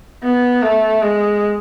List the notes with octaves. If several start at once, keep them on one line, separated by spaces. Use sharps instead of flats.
B3
A3
G#3